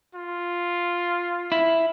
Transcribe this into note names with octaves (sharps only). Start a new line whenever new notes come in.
F4
E4